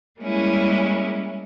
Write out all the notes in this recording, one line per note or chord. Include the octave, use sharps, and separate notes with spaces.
G3 G#3 A#3 C#4 E4